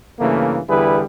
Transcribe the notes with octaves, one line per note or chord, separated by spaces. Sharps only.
G2 C#3 E3 A3 A#3
E2 D3 G3 E4 G#4 B4